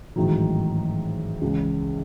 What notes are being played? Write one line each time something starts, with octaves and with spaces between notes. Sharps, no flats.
A1 G#2 D#3 F#3
C#2 C#3 E3